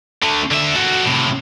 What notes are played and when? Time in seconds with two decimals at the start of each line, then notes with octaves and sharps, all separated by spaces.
0.22 D3 A3
0.52 D3 E5
0.76 F#4 A4
1.06 A2 C3